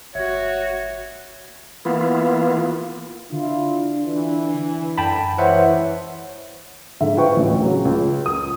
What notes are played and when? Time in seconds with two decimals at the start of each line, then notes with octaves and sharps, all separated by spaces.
0.15 G1 F#4 C#5 E5
1.85 E3 A#3 B3 E4 F4
3.32 D3 D4 E4 F4
4.05 E3
4.98 F#2 D3 G5 A5 B5
5.38 C3 E3 G#3 C5 C#5 E5 F#5
7.01 G#2 D3 E5
7.17 E4 F4 B4 C5 G5 C#6
7.36 A1 D2
7.62 C#3 F#3
7.85 C#2
8.26 D#6